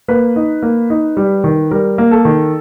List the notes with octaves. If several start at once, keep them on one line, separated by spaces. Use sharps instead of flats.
A#3 B4
D#4
A#3
D#4
G3
D#3
G3 A#4
A#3
A4
D#3